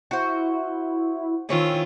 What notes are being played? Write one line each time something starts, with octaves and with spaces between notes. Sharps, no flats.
E4 F#4 C5
D#3 C4 C#4 E4 F4